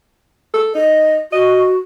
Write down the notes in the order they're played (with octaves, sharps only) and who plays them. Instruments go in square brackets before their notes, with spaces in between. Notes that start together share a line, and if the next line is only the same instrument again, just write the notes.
[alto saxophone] A4
[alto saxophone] D#4 [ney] D#5
[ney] F#4 [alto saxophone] D#5